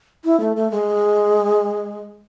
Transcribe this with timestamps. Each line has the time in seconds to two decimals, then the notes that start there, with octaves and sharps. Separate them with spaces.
0.24 E4
0.40 A3
0.56 A3
0.71 G#3